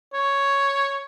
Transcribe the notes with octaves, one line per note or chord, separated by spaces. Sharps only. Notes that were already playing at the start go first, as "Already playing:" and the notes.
C#5